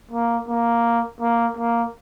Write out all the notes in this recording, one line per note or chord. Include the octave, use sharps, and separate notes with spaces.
A#3
A#3
A#3
A#3